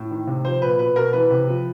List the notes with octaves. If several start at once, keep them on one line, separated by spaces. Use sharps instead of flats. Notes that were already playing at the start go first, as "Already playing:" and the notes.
Already playing: A2
D#3
C3
F3 C5
A#2 B4
B2 B4
B2 A#4
E3 B4
C3
F3